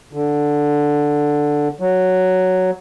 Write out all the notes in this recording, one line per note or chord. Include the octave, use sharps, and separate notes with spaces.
D3
F#3